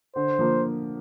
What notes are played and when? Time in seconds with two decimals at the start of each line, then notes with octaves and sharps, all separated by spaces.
0.16 D3 C5
0.39 F3 A#3